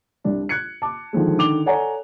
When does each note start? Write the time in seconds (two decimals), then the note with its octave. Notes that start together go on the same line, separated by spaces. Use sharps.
0.24 C2 D4
0.49 F#6 G#6 C#7
0.82 A5 D6
1.13 D3 D#3 F3 G#3
1.37 D3 D#3 D6 F7 G7
1.66 A4 C#5 D5 F#5 G#5 A#5